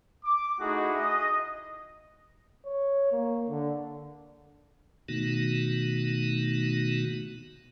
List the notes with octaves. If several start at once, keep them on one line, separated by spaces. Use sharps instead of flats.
D6
A3 D#4 E4 F#4 G#4 D#5
D#5
C#5
A#3
D3
B2 D#3 A3 B3 D#4 F#4